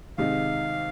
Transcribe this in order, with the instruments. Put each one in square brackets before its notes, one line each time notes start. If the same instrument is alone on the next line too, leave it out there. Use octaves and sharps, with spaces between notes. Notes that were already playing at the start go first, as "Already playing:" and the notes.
[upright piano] C3 D#3 G#3 D#4 [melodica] F5